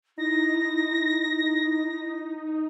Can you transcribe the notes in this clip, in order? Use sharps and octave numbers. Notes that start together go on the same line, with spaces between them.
D#4 E4 A#6